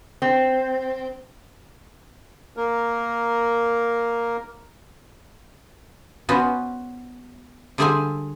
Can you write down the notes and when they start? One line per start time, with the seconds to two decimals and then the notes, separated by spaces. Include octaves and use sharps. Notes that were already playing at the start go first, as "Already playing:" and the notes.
0.22 C4
2.57 A#3 A#4
6.29 B3 C#4 F#4 C5
7.78 D3 G3 G#4 C5 E5 G#5